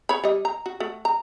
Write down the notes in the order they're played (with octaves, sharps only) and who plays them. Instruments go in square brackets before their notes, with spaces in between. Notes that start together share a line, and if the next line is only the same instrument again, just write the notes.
[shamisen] C#5 B5
G3 D#5
A#5
F#4
A3 F#4
A#5